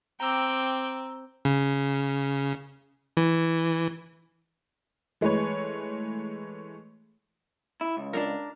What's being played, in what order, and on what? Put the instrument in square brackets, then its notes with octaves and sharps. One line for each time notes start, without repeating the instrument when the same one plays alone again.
[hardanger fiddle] C4 [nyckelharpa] G5 D6 [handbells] A#5 E6
[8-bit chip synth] C#3
E3
[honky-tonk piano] E3 G#3 A3 B4 C#5
[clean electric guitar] E4
C#2
[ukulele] D4 D#4 A#4